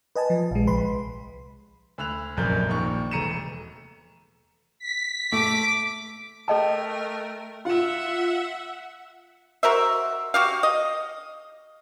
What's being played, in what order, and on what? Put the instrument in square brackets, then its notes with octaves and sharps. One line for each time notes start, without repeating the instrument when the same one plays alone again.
[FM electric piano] B4 D#5 G#5 A5
F3
A#1 G#3
C2 B4 B5 C6
[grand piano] D2 B5 E6 F#6 F7
F1 A#1 F#2 A#4 G6
A#1 D#2 C#6
E1 A3 A#5 C#7 D#7 E7
[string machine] B6
[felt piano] A3 [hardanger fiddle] D6
[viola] A3 A#4 [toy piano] A4 D#5 A5 [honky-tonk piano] G5
[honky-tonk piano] F4 E7 [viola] E5 F#5
[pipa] F#4 A#4 C5 E5
F#4 G4 F5
D#5